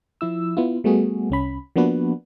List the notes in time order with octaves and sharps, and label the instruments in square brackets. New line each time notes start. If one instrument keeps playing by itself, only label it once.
[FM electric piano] F3 E4 E6
B3 E4 F4
G3 A3 B3 F#4 G#4
C2 C#4 B5
F3 A#3 B3 D4 F#4 B4